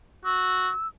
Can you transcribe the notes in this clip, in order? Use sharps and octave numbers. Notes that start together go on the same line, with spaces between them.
F#4 E6